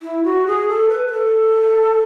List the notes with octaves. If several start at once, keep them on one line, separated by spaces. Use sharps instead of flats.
E4
F#4
G#4
A4
B4
B4
A4